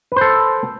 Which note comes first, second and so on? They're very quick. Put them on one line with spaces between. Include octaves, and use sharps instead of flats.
B4 C5 A4